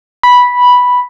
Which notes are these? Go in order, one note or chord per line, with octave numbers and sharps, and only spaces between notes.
B5